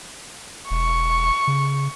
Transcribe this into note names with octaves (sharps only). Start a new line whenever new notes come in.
E1 C#6
C#3